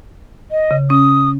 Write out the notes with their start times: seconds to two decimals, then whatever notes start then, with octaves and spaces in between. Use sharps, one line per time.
0.51 D#5
0.71 C#3
0.90 C#4 D#6